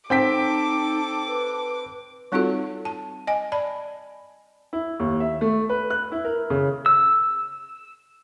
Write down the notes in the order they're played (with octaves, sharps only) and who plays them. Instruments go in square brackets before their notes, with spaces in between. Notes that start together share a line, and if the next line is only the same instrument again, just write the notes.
[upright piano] C4 G5 B6 [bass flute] D#4 [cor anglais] A4 [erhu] D6
[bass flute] B4
[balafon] G3 C4 D#4 F4 F#4 A4
A5
D#5 G#5
D5 A5 B5
[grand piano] E4
D#2
E5
A3
B4
F#6
E4
A#4
C#3
[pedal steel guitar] E6